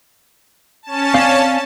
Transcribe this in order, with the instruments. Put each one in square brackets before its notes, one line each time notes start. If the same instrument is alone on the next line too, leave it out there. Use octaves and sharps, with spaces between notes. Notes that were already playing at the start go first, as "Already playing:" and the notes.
[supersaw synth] C#4 A5
[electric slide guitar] C4 D5 F5